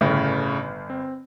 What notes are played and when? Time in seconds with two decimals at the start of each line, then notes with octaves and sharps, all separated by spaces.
0.01 G1 A2 C#3
0.90 C4